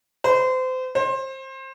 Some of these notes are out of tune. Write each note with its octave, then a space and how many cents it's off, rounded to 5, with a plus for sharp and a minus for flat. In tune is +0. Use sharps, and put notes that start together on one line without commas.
C5 -30
C5 +25